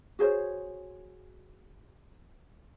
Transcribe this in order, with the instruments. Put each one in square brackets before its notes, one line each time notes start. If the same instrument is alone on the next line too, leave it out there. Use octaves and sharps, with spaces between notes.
[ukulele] F#4 G#4 C5 C#5